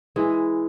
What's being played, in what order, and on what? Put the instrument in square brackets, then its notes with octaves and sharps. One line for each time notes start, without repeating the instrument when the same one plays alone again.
[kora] E3 G#3 [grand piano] E4